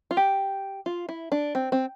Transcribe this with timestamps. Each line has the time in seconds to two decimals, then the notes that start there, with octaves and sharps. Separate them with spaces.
0.11 F4
0.17 G4
0.86 F4
1.09 E4
1.32 D4
1.55 C4
1.72 C4